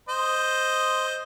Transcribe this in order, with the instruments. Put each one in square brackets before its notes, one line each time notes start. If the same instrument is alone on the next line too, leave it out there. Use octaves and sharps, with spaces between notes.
[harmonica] C5 D#5